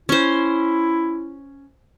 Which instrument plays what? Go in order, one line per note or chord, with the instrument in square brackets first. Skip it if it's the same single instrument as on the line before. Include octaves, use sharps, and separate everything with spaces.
[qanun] C#4 C5 [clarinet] E4